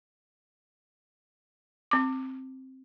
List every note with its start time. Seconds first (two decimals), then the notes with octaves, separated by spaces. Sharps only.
1.91 C4 D6